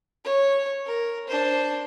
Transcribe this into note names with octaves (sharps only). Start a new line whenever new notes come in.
C#5
A#4
D4 C5